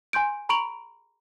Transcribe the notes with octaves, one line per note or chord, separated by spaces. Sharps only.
G#5 C6 G6 D7
A#5 B5 C#6 D7 F7 F#7